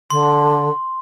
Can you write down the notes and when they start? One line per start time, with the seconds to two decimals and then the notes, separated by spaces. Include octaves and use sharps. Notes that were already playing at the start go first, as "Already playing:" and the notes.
0.10 D3 C6